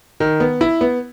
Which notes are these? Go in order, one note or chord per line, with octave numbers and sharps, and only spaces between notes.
D#3
B3
E4
B3